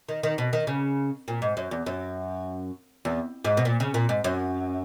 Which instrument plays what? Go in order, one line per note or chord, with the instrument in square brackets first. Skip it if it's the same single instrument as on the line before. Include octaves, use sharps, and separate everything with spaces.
[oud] D#3
D#3
B2
D#3
C#3
A#2
G#2
F#2
E2
F#2
E2
G#2
B2
A#2
C#3
A#2
G#2
F#2